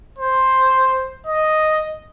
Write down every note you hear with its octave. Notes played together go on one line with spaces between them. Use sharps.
C5
D#5